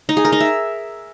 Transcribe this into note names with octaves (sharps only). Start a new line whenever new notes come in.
D#4
G#4
A#4
D#4
E5